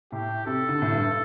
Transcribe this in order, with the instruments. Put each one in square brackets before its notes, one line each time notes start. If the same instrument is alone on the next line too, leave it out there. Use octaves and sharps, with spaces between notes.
[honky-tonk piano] A2 [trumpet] G4
[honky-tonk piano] C3 [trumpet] A4
[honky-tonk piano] D3
A2
G2